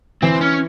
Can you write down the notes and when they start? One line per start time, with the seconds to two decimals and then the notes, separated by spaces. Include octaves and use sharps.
0.22 E3 C4
0.41 C#4